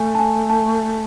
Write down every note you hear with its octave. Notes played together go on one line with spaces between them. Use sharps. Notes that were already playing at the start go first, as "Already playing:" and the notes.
Already playing: A3 G#5
A5
G#5
A5